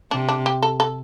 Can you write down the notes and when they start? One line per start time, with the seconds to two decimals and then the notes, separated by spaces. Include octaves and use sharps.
0.11 C3 D4
0.29 D4
0.46 G4
0.62 A4
0.80 A4